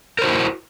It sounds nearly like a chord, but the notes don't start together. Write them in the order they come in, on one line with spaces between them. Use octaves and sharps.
A#4 C5 F#4 E4